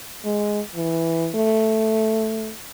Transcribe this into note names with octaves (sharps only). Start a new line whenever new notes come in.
G#3
E3
A3